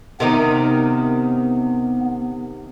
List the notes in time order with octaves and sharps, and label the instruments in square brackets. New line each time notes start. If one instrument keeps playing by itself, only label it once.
[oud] C3 D#3 D#4 [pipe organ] B3